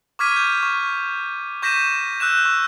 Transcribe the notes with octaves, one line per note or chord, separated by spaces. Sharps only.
C#6 D6 F6 G#6 B6 D#7
G6
C#6
C#6 G6 A#6 B6 D#7 E7
E6 F#6 G6 E7
C#6 E6